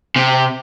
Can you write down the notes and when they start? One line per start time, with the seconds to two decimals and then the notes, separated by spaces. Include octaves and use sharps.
0.16 C3